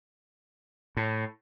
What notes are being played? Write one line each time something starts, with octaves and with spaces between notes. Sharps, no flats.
A2